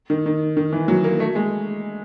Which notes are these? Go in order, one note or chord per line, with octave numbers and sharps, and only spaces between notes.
D#3
D#3
D#3
E3
F#3
A#3
A3
G#3